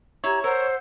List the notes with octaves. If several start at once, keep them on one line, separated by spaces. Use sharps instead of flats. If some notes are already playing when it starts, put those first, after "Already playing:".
E4 G4 C#5 A#5 G#6
A#4 C5 F#5 E6